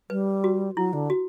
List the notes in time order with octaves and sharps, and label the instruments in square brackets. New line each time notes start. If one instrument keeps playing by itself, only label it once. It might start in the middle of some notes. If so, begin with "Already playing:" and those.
[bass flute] G3 [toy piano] B4
[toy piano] F#4
[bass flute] F#3 [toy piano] E4
[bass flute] D3
[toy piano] F#4